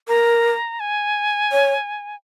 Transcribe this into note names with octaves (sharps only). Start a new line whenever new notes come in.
A#4 A#5
G#5
C#5